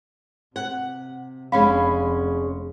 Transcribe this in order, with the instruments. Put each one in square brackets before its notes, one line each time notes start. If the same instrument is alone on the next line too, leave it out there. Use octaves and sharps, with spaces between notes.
[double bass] C3 [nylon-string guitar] F#5
[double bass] F1 [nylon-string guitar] G#3 C#4 D4 [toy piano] F5 B5